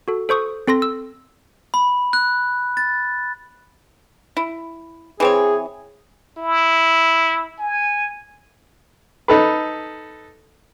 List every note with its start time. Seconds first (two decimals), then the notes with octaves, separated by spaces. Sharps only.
0.08 F#4 A4
0.29 A4 C5 C#6 D#6
0.68 C4 A4 C6 A#6
0.82 E6
1.74 B5
2.13 F#6
2.77 A6
4.37 E4
5.20 E3 C4 G#4 C#5
6.38 E4
7.59 G#5
9.28 D#4 A4 B4